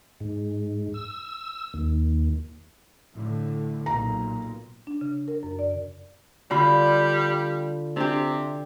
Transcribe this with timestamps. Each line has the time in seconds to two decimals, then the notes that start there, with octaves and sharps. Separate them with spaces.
0.20 G#2
0.94 E6
1.74 D#2
3.14 A2 D3
3.86 B1 A#2 A#5
4.87 D4
5.01 C#3
5.28 A#4
5.43 F#2
5.59 D5
6.51 D3 G3 F4 B5
7.96 C3 D4 G4